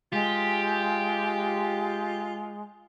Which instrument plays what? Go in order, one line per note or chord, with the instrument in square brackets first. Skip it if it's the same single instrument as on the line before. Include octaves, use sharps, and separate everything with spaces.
[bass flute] G#3 [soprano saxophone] F4 [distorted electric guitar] G4